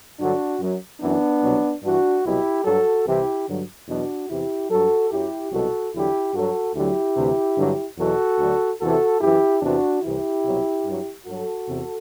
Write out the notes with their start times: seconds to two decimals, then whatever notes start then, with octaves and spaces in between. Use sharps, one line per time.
0.19 G2 D3 F#3 D4 F#4
0.60 F#2 F#3
1.00 F#2 E3 B3 D4
1.42 C2 B2 F#3
1.82 G2 E3 D4 F#4
2.24 C2 B2 F#3 E4 G4
2.65 G2 F#3 F#4 A4
3.06 C2 C3 E3 E4 G4
3.48 G2 D3 F#3
3.88 E2 B2 F#3 D4 F#4
4.29 E2 C3 E3 E4 G4
4.70 G2 F#3 F#4 A4
5.11 F#2 F#3 E4 G4
5.52 C2 B2 F#3 F#4 A4
5.94 E2 D3 F#3 E4 G4
6.34 G2 F#3 F#4 A4
6.75 D2 D3 F#3 E4 G4
7.16 D2 C3 E3
7.57 G2 D3 F#3
7.98 E2 B2 F#3 F#4 A4
8.39 D2 D3 F#3
8.80 E2 C3 E3 F#4 A4
9.21 F#2 E3 E4 G4
9.62 E2 C3 E3 D4 F#4
10.03 C2 C3 E3 E4 G4
10.44 C2 B2 F#3
10.85 G2 F#3
11.26 G2 F#3 F#4 A4
11.68 E2 C3